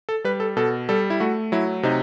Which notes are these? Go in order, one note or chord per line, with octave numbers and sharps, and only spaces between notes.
A4
G3 B4
A4
B2 A4
G3 A4
E4
A3 F#4
F#3 E4
C3 D#4